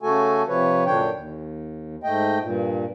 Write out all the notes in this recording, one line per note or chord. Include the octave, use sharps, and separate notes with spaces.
C#3 A3 F#4 A4 G#5
C3 F3 B4 C#5
F#2 A#2 D3 D4 C#5 G5
D#2
G#2 A3 D#5 G5
G2 A#2